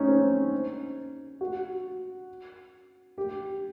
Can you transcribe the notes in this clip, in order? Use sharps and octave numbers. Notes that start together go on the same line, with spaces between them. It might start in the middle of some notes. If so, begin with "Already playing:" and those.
Already playing: C#4 D#4
C4
F#4
G4